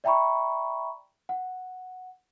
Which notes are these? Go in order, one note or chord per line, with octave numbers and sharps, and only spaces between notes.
D5 E5 G5 A#5 B5 C#6
F#5